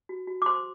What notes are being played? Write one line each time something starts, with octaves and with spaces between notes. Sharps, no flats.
F#4
F#4
D6
C5 C6